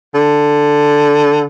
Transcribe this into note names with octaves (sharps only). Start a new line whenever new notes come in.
D3